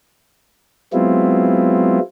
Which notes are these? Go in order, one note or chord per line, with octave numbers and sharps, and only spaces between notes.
F#3 G#3 B3 C4 E4 F4